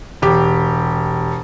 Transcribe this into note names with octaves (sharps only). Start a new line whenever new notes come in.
E1 G4